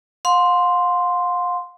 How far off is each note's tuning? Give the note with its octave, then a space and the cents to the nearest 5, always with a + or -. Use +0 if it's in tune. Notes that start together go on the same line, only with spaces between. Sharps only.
F5 +40 C6 +0